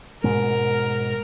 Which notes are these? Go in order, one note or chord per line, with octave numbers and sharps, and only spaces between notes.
G#2 B2 G#3 A#4